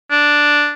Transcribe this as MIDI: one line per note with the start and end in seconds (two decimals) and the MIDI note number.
0.11 0.73 62